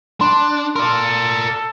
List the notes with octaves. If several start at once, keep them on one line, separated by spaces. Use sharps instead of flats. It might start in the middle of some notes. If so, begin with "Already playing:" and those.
D4 C6
A4 A#4 D5 C6